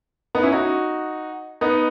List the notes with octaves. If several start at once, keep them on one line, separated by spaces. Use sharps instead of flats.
B3 D#4
C#4 E4
D#4 F#4
B3 D#4